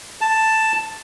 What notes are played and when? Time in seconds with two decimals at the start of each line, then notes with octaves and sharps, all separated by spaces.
0.21 A5